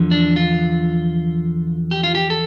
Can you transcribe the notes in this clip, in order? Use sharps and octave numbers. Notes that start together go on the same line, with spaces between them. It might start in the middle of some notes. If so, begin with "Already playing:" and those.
Already playing: E2 D3 F3
D4
F4
G4
F4
G4
A4